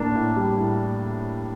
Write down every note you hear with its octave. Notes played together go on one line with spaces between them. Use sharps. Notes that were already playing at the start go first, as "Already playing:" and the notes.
Already playing: A2 A#3 D4
A2
G3
A2